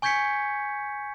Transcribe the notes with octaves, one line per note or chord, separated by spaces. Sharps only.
G#5 C#6 G6 G#6 B6 C#7